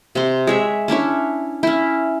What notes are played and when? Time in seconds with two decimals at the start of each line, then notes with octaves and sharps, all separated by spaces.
0.15 C3 C6
0.47 G#3 C#5 E5
0.88 C#4 D4 E4 C#5
1.63 C#4 E4